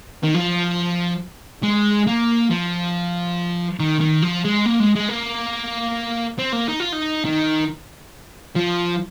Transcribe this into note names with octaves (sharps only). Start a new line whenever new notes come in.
D#3
F3
G#3
A#3
F3
D#3
D#3
F3
G#3
A#3
G#3
G#3
A#3
C4
A#3
D#4
F4
D#4
D#3
F3